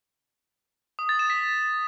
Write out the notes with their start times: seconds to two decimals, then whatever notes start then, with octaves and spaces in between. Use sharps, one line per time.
0.99 D#6
1.09 A6
1.19 E7
1.30 B6